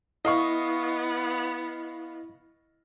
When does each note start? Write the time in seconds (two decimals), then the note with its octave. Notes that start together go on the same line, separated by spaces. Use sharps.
0.25 B3 E4 D#5 F5 C#6